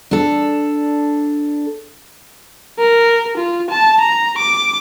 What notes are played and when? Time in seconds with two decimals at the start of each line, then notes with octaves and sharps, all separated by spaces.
0.11 D4 A4
2.79 A#4
3.37 F4
3.71 A5
4.01 A#5
4.38 D6